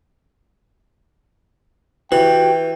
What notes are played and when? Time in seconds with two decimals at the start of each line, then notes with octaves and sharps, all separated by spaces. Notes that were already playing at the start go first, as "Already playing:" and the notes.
2.12 E3 F#4 G4 G5